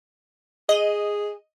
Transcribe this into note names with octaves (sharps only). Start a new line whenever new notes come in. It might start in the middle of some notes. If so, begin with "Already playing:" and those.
G#4 D#5